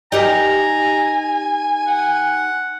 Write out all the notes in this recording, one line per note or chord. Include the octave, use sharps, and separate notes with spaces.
D#4 G4 A#4 G#5 A#5
F#5